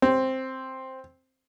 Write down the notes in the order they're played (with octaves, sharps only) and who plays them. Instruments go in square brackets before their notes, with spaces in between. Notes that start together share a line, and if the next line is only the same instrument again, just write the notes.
[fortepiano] C4